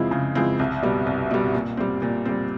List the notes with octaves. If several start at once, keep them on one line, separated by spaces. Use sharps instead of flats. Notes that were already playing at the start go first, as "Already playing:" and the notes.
Already playing: C#3 F3 G#3 C4 E4
C#3
F3 G#3 C4 E4
C2
B2 G3
C2
B2 G3
A#2
G3 C4
A#2
G3 C4